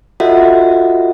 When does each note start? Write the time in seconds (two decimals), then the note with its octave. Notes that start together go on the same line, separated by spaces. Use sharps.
0.20 F4 F#4 A4 D#5 E5 F#5